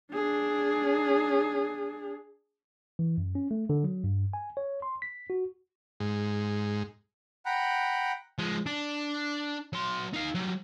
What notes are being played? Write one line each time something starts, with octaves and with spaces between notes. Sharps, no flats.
D4 G#4
E3
F#2
C#4
A3
D3
F#3
G2
G#5
C#5
C6
B6
F#4
G#2
F#5 G5 A#5 B5 F#6
F3 G#3
D4
F#3 C6
D#4 F5
F#3 G3